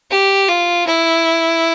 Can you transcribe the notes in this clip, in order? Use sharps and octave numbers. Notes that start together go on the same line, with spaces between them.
G4
F4
E4